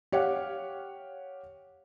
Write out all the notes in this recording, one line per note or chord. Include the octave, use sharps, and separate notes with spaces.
G4 C#5 F5 F#5